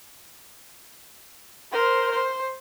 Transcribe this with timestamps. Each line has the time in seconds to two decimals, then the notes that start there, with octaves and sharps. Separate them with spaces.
1.72 A#4 C5
2.12 C5